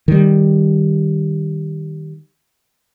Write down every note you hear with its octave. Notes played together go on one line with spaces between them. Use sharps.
D#3 G3